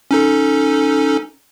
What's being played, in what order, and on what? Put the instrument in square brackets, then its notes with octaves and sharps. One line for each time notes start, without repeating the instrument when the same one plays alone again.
[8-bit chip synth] C#4 D#4 A4